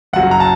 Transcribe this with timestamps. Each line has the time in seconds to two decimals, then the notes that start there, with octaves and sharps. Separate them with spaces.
0.13 F#1 F#2 F#3 F#5
0.31 A#5
0.40 A5